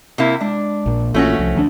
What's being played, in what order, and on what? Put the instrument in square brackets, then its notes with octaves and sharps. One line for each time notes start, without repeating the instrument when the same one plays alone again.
[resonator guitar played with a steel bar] C3 A#3 E4
[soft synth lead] G#3 [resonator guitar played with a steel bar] D4
[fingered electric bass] A#1 A#2
[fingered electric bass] A#1 E3 A#3 [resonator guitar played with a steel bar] A3 C#4 F#4 [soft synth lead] F4
[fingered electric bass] C2 [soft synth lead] F3
[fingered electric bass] D2 G#3 D4